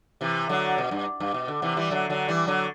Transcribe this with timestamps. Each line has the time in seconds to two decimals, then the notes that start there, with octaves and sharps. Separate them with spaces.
0.21 C3 E3
0.49 D3 F#3
0.78 B2
0.91 G2
1.20 G2
1.34 B2
1.48 D3
1.62 C3 E3
1.77 E3 G3
1.91 D3 F#3
2.10 D3 F#3
2.28 E3 G3
2.47 D3 F#3